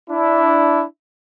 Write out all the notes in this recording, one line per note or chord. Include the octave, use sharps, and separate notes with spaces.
D4 E4